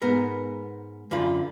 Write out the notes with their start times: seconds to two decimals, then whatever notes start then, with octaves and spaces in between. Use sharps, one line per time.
0.02 G#2 B3 A#4
1.11 F#2 D3 F4 B5